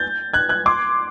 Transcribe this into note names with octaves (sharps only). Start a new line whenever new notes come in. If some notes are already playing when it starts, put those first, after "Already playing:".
Already playing: G6 A6
F#6 G#6
F#6 G#6
C6 D6